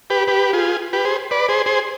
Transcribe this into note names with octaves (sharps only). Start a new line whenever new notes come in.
G4 B4
G4 B4
F4 G#4
G4 B4
G#4 C5
B4 D5
G#4 C5
G#4 C5